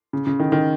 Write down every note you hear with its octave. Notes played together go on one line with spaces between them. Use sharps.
C#3
C#3
D#3
D#3